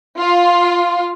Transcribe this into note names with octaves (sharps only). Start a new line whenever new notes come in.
F4